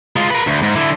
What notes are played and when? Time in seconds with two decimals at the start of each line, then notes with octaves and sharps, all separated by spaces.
0.16 G#3 F4
0.30 A#4 B4
0.47 D2
0.63 G#2
0.75 D3 E4